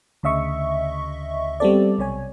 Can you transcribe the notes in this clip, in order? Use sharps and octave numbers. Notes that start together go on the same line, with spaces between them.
D2 C#3 D#5 E5 C#6
G3 B3 C4 A4 D5
B1 C3 C#5 G#5